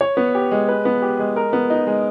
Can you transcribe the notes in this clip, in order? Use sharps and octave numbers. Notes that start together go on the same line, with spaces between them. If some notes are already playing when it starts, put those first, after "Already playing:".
C#5
B3
G4
G#3
B4
B3
G4
G#3
A#4
B3
D#4
G#3